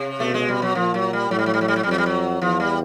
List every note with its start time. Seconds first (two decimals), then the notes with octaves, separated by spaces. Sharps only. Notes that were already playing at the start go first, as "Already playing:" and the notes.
Already playing: C3
0.20 B2 A3
0.34 G#3
0.48 G3
0.62 F#3
0.75 A#2 F3
0.94 F#3
1.13 G3
1.30 A2 F#3
1.39 G3
1.46 F#3
1.54 G3
1.61 F#3
1.68 G3
1.76 F#3
1.83 G3
1.87 F2 F#3
1.98 G3
2.06 F#3
2.42 E2 F3
2.60 G3